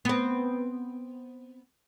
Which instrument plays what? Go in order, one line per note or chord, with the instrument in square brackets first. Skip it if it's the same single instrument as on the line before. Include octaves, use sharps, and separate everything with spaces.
[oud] B3 C4